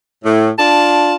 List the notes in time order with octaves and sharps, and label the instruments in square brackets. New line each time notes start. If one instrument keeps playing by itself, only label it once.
[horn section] A2
D4 F4 A5